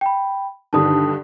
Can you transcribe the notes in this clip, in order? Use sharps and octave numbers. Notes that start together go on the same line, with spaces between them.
G5 B5
G2 D3 D#3 A5 D#6